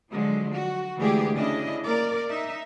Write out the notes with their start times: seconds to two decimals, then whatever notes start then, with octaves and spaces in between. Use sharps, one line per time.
0.11 D3 F3 F#3 G#3
0.53 F#4
0.97 D2 E3 G#3 G4 G#4
1.35 C#3 D4 E4 D#5
1.84 A#3 A#4 D5
2.29 D#4 E5